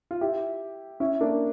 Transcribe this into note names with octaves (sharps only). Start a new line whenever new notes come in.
F4
E4 G4
C#4 E4
A#3 D4